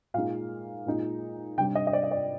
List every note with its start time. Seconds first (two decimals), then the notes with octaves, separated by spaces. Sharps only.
0.14 A#2 G#3 D#4 F5
0.86 A#2 G#3 D#4
1.58 C3 G3 D4 G5
1.75 D#5
1.87 D#5
1.93 D5
2.04 D#5
2.11 D5